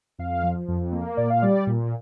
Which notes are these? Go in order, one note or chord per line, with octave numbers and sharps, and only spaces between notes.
F2 F5
F3
F2
A#3
A#2 D5
F5
G3 D5
A#2